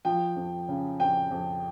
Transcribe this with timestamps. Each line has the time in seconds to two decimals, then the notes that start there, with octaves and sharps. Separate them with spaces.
0.05 F3 G5
0.36 F2
0.68 C#3
1.00 F2 G5
1.31 F2